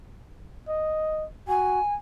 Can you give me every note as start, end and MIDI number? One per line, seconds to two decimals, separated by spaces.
0.68 1.25 75
1.48 1.80 66
1.48 1.95 80